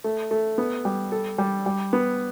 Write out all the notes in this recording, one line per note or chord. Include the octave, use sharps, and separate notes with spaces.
A3
A3
B3
G3
A4
G3
G3
B3